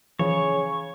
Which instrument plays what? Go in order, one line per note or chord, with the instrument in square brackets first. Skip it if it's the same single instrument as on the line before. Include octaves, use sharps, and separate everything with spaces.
[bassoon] C#3 [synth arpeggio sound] E3 F3 [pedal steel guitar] C#5